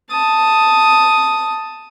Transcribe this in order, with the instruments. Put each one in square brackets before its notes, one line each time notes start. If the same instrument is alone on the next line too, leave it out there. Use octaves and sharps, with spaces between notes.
[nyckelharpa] A5 D#6